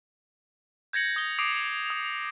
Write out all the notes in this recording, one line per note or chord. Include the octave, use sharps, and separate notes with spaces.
G6 G#6 A#6 C#7 F#7
D#6 G7
D6 D#6 C7 D7 F7
D#6 F7